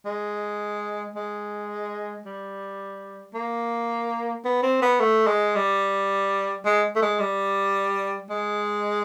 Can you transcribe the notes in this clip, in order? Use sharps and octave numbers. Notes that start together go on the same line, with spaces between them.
G#3
G#3
G3
A#3
B3
C4
B3
A3
G#3
G3
G#3
A3
G#3
G3
G#3